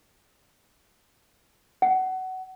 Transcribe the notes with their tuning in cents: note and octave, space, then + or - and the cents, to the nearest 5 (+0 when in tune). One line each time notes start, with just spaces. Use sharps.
F#5 +20